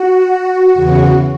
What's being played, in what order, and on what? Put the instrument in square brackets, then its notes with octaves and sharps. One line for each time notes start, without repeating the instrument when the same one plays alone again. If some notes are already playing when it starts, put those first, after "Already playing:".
Already playing: [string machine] F#4
E2 C#3 E3